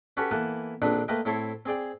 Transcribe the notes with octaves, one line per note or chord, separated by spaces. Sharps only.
C#4 F#4 G4 A4 B4 C#5
E3 A#3 B3 A4 B4
A#1 D3 D#3 C4 D4 B4
A3 A#3 B4 D#5 G5
A2 C4 E4 A4 C#5 C6
C4 G#4 D5 G5